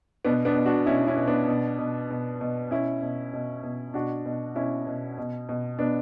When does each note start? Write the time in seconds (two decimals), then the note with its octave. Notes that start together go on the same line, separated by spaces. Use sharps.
0.25 B2 B3 D4
0.45 B3 D4
0.55 B2
0.66 D4 F#4
0.86 B2 C#4 E4
1.07 C#4 E4
1.17 B2
1.27 B3 D4
1.48 B2
1.79 B2
2.10 B2
2.41 B2
2.71 B2 C#4 E4
3.02 B2
3.33 B2
3.63 B2
3.94 B2 D4 F#4
4.26 B2
4.56 B2 C#4 E4
4.87 B2
5.18 B2
5.49 B2
5.79 B2 B3 D4